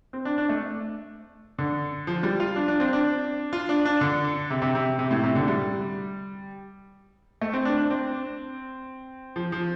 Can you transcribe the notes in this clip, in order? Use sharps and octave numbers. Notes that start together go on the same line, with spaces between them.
C4
D4
D4
A3
D3
F3
G3
F4
D4
D4
C4
D4
F4
D4
D4
D3
C3
C3
C3
C3
A2
C3
D3
G3
A3
C4
D4
D4
C4
F3
F3